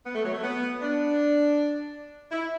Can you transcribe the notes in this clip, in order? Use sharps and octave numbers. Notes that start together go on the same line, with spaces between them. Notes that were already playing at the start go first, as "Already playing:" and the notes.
B3
A3
F#3
A3
B3
D4
E4